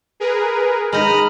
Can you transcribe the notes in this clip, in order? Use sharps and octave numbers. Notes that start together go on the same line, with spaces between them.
G#4 A#4 B4
G#3 D#4 A#5 B5 D#6 F6